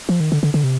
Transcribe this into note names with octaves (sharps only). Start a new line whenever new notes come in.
F3
D#3
D3
D3
D3
C3